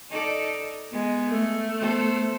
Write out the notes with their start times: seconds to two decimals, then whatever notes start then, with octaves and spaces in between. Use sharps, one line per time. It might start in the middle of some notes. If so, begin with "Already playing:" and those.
0.10 D#4 A4 D5
0.91 G#3 B3
1.28 A3
1.80 B3 A4 C5